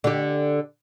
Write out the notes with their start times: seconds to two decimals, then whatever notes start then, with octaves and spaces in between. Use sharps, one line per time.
0.04 D3 G4